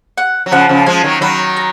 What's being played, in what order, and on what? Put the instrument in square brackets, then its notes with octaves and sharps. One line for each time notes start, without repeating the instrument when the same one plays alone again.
[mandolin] F#5
[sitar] F#3
[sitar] C#3 F3 [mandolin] F#5
[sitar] C#3 F3
[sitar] F3 G#3 [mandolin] G#5
[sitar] D#3 F#3
[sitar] D#3 F#3 [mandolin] B5
[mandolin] A#5